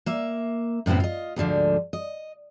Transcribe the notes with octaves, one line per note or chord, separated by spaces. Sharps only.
A#3 E5
F#2 A2 C#3 B3 C4
F4 D#5
D2 G#2 D3 F3
D#5